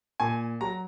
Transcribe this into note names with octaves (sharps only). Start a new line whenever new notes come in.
A#2 G#5
F#3 A#5